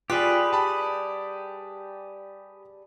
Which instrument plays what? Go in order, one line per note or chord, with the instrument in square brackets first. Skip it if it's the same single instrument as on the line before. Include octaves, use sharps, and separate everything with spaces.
[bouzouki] G3 B4 [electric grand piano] F4 [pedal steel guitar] G4 G#4
[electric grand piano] A5 B5